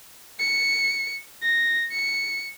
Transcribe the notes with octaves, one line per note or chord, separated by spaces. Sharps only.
C#7
A#6
C#7